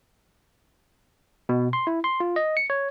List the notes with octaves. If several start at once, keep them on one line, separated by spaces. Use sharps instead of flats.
B2
C6
E4
C6
F4
D#5
C#7
C#5